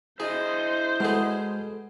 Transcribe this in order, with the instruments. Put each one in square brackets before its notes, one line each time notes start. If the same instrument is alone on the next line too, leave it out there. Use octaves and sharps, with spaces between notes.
[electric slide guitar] E4 D#5 [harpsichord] G#4 [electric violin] C5
[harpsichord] B2 G#4 [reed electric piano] G#3 A4